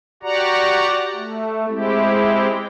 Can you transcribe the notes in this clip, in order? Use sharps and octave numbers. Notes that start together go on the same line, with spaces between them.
F#4 G4 D5 F#5 A#5
A3
G#3 C4 E4 G4